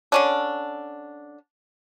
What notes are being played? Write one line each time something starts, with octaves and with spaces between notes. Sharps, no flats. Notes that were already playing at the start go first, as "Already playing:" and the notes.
D3 C#4 D4